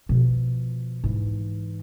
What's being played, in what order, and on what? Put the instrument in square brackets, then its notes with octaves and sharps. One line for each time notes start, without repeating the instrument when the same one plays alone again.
[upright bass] B2 F3
G#2 E3